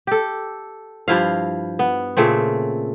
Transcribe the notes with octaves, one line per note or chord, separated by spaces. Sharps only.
G4 A4
G2 F3 E4 F5
B3
A#2 C#3 A3 C4